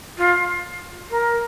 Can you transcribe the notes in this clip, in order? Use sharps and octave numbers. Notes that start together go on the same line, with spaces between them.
F4
A#4